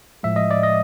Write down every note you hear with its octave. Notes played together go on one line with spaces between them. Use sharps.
A2 F3 G#3 E5
D#5
D5
D#5